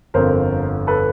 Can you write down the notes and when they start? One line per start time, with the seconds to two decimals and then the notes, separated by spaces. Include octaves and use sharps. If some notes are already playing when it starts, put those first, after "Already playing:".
0.14 G1 F2 D3 A#4 C5
0.87 A4 B4